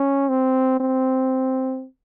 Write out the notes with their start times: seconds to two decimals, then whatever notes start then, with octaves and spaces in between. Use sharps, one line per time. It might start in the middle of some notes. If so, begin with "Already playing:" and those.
Already playing: C#4
0.29 C4
0.80 C4